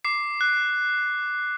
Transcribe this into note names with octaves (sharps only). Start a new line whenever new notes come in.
D6 C7
F#6